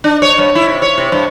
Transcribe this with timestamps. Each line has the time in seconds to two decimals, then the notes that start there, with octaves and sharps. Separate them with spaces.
0.04 D4
0.22 C#5
0.38 G2
0.55 E4
0.69 C3
0.82 C#5
0.98 C3
1.12 G2